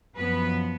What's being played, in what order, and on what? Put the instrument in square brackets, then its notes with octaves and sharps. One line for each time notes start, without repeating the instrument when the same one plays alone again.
[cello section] F#2 F3 B3 B4